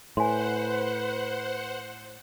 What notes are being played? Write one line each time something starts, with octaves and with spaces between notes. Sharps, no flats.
A2 B4 C5 F#5 G#5 C6